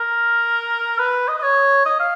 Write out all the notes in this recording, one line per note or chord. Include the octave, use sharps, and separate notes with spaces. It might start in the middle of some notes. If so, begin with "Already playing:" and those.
Already playing: A#4
B4
D#5
D#5
C#5
D#5
F5